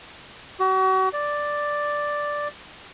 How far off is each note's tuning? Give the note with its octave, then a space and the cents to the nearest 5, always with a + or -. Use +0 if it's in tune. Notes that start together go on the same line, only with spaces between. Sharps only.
F#4 +35
D5 +0